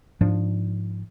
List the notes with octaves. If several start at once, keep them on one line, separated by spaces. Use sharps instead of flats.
G#2 F3 D4